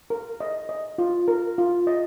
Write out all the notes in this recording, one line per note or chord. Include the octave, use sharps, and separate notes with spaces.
A#4
D#5
D#5
F4
A#4
F4
D#5